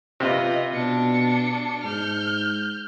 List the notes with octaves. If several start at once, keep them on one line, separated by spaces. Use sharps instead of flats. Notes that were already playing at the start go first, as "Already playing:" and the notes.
C3 F4 B4 D#5
B2 D4 C#7
G#2 F6 G6